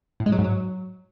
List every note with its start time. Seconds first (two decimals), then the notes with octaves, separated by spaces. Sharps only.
0.20 A2
0.26 G#3
0.32 F#3
0.38 G#2
0.44 F#3